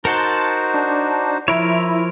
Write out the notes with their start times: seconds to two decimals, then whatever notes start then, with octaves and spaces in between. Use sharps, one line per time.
0.05 D#4 F#4 A#4 C5 F#5 A5 C6
0.74 D4
1.48 F3 E4 A#4 C#5